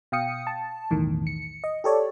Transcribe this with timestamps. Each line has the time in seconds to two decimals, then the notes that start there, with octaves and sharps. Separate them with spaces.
0.12 B2 F5 G5 D#6 C#7
0.47 A5
0.90 B1 E2 A2 D#3
1.27 C#7
1.64 D#5
1.84 G4 A4 C#5 D5